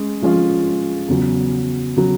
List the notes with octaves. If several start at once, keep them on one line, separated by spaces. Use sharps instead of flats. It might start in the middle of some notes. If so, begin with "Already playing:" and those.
Already playing: G#3 C#4
F3 G#3 C#4 F4
E2 C#3 F#3
C#3 F#3